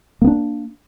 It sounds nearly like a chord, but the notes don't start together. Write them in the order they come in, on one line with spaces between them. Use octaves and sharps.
A#3 B3 D4